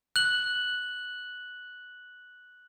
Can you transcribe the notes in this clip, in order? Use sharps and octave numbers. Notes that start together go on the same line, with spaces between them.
F#6 F#7